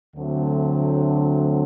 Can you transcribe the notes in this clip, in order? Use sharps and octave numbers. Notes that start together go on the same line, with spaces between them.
D2 D3 F#3 A3 C4